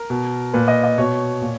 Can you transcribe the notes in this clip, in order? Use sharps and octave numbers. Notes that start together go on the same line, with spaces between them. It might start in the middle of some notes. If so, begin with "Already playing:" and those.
Already playing: A#4
B2
A#2 B4
D#5
D#5
B2 C#5
A#2